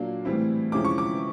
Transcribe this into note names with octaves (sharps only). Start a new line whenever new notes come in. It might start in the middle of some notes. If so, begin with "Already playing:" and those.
Already playing: A#2 F#3 A#3 D4
A2 E3 G3 C4 E4
C3 F3 G#3 C#4 E4 D6
C#6
D6